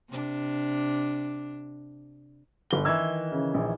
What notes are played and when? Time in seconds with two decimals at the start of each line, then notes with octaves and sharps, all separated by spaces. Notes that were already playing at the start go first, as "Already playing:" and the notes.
0.10 C3 D4
2.71 G1 G7
2.85 D#3 E3 E6 G#6
3.32 C#3
3.54 A#1